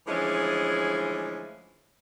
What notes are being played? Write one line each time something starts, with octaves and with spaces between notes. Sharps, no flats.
D3 E3 F3 G#3 A3 C#4